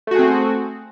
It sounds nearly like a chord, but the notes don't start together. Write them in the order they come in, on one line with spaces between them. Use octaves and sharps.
A3 F#4 G#4 C4